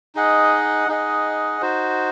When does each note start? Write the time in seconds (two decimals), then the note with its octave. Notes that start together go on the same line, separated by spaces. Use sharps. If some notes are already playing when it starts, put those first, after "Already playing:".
0.15 D#4 G#4 D#5 F#5
0.88 D#4 G#4 D#5 F#5
1.62 D#4 F#4 C5